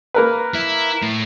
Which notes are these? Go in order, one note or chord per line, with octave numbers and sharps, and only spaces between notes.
A#3 A#4 B4
E4
A2